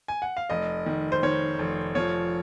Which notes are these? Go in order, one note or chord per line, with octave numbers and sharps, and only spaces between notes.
G#5
F#5
F5
F1 D#5
D#3
C5
D#3 C#5
F1
F3 C#5